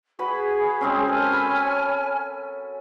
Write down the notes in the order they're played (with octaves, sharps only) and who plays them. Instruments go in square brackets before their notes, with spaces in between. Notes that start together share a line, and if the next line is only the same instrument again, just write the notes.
[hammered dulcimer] F#4 B4 B5 [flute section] G#4
[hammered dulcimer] G#3 C4 C#4
[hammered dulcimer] A4 A#4 [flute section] C#5 G#5 F6
[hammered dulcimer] B5